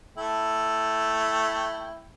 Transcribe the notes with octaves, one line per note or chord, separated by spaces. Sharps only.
A3 E4 G5